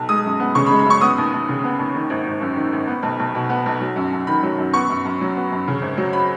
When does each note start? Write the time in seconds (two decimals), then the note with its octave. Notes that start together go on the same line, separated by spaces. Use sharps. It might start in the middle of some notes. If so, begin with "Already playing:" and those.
Already playing: B1
0.09 G#3 D#6
0.24 F#2
0.40 B3
0.55 C#3 C#6
0.66 B5
0.71 G#3
0.79 B5
0.86 F#2 C#6
1.01 B3 D#6
1.18 D#2
1.33 D#2
1.49 C#3
1.64 B3
1.79 D#2
1.95 D#3
2.10 G#1
2.26 G#1
2.41 F#2
2.56 D#3
2.73 G#1
2.87 B3
3.03 B1
3.20 B1
3.35 B2
3.49 B3
3.66 B1
3.81 F#3
3.96 F#2
4.13 F#2
4.27 D#3 B5
4.43 F#3
4.58 F#2
4.73 B3 C#6
4.89 F#2
5.05 F#2
5.21 F#3
5.36 B3
5.52 F#2
5.68 C#3
5.82 G#1
5.97 F#3
6.13 B5